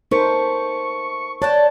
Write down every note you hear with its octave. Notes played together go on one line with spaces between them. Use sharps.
A3 D#4 A#4 C5 C#6
C#5 D5 F#5 G5 A5